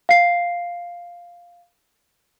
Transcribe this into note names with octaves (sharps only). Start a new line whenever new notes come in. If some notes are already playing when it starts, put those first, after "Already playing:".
F5 C7